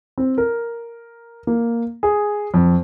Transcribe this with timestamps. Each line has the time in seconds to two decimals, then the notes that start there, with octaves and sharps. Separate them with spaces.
0.18 C4
0.38 A#4
1.47 A#3
2.03 G#4
2.54 F2